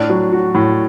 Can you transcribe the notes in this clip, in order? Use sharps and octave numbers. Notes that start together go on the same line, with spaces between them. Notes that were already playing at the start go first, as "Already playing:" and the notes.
Already playing: A2 D4
F#3
F#4
A2